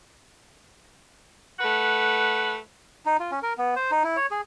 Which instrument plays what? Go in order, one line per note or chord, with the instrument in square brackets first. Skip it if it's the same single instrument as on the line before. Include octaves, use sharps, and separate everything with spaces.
[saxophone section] A3 B4 F#5
[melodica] D#4
F4
C#4
A#4
B3
C5
D#4
E4
C#5
G#4